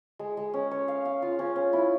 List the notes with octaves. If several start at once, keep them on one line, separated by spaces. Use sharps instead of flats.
G#3
G#3
C#4
C#5
F5
F5
F4
C#4
C#4
E4